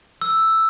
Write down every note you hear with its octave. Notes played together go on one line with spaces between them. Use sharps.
E6